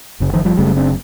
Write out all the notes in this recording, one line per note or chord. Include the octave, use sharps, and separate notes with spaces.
F#1 F#2 C#3
D#3 F3
F3 G3
F#1 F#2 C#3 G3 A3
C4 D4